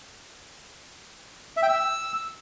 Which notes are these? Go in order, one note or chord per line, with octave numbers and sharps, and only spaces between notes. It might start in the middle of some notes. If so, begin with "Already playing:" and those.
E5
G5
E6